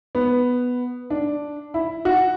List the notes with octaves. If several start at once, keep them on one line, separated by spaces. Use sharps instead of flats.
B3
D4
E4
F#4